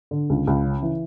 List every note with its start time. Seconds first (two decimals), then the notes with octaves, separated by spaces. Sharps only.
0.11 D3
0.30 C#2
0.47 C#2
0.64 C#3
0.82 E3